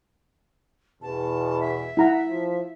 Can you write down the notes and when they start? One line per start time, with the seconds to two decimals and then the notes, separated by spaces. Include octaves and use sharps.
1.02 E2 B2 A5
1.61 E5
1.97 E4 F#5 A#5
2.29 F3